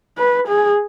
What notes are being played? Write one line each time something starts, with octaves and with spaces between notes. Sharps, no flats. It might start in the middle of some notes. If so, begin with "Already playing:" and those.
B4
G#4